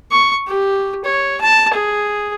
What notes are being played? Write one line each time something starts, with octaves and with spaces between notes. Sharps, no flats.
C#6
G4
C#5
A5
G#4